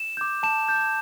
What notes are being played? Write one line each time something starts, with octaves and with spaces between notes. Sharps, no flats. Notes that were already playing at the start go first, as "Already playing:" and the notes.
Already playing: E7
D6 G6
A5 E7
G6